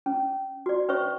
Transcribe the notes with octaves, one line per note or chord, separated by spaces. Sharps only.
C#4
F#4 D5
C#4 B4 C#5 E5 C#6